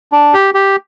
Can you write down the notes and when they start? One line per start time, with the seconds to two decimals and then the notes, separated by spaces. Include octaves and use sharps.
0.12 D4
0.34 G4
0.54 G4